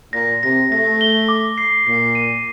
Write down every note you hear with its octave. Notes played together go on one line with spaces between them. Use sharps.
A#2 A#6
C3 A#6
A3 A#6
G7
D6
C7
A#2 C7
D#7